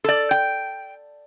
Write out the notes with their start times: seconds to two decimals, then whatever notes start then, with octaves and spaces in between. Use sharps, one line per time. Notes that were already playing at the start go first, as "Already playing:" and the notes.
0.04 A4 D5
0.31 G5